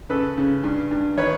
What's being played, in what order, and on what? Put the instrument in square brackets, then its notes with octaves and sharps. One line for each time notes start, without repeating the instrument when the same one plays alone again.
[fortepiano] C#3 A4 B4
C#3
G2
G2
D#3 B4 C#5